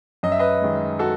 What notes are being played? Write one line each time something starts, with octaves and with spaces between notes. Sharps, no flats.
F#2 D#5
E5
B4 D#5
D#3 G#3
F#4 A4